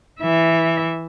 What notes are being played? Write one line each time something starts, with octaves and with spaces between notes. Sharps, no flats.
E3 E5